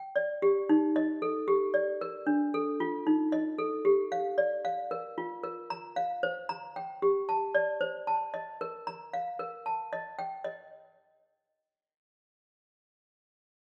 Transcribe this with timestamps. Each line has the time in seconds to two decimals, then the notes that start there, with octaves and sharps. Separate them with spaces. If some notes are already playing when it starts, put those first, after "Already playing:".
Already playing: G5
0.16 D5
0.42 G4
0.69 D#4
0.96 D#5
1.22 A4
1.48 G4
1.74 D5
2.01 A#4
2.27 D4
2.54 A4
2.80 F4
3.07 D#4
3.32 D#5
3.58 A4
3.85 G4
4.12 F5
4.38 D5
4.65 F5
4.91 A#4
5.18 F4
5.43 A#4
5.70 A#5
5.96 F5
6.23 C5
6.49 A#5
6.76 G5
7.02 G4
7.29 A5
7.55 D5
7.81 C5
8.07 A5
8.34 D#5
8.61 A#4
8.87 A#5
9.13 F5
9.39 A#4
9.66 A5
9.93 D#5
10.19 G5
10.44 D#5